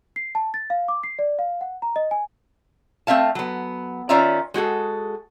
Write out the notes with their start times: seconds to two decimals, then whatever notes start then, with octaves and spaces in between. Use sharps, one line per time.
0.16 C7
0.35 A5
0.54 A6
0.70 F5
0.88 D6
1.03 C7
1.19 D5
1.39 F5
1.61 F#5
1.82 A#5
1.96 D#5
2.11 G#5
3.07 A3 C4 E5 F5 A5
3.35 F#3 B3
4.09 D#3 C#4 F4 D5 E5 A#5
4.54 G#3 F#4 G#4 A4